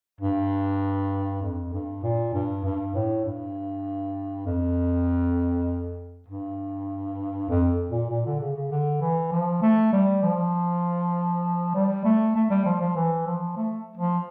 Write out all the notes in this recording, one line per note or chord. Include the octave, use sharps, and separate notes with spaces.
G2
F2
G2
A#2
G2
G2
A2
G2
F2
G2
F2
A#2
A#2
D3
C#3
C#3
D3
E3
F3
A3
G3
F3
G3
A3
A3
G3
F3
F3
E3
F3
A3
F3